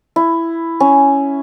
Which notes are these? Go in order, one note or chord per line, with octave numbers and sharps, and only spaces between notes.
E4
C#4